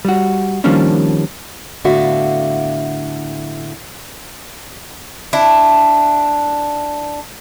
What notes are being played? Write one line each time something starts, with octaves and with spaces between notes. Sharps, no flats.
G3 F#4
D#3 F3 G3 A#3 C#4 D4
A2 D3 B3 F#4 E5 F5
D4 E4